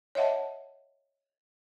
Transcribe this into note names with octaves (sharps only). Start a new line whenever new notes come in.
C#5 D#5 E5 F#5 A5